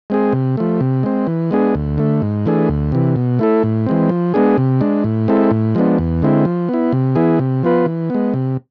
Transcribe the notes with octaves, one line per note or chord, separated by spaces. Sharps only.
G#3 C4 G#4
C3
F3 A3
C3
G#3 C4
E3
G#3 B3 D4 G#4
D2
D3 A3
G#2
E3 A3 D4 G#4
D2
C3 E3
B2
A3 E4 A4
A2
E3 G#3 C4
F3
G#3 B3 D4 G#4
C3
G#3 D4
A2
G#3 C4 E4 A4
A2
F3 G#3 B3 D4
E2
D3 G#3 C4 E4
F3
B3 E4
C3
E3 B3 E4 G#4
C3
F3 B3 F4 B4
E3
G#3 B3
C3